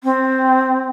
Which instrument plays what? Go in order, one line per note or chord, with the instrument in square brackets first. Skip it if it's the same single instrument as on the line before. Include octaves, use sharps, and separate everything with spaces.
[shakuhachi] C4